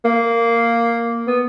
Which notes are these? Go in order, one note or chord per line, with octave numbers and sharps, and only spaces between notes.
A#3
B3